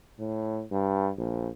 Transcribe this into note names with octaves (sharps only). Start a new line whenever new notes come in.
A2
G2
A#1